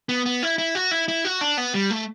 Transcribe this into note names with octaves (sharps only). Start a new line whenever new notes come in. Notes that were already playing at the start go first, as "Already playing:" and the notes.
B3
B3
E4
E4
F#4
E4
E4
F#4
D4
B3
G3
A3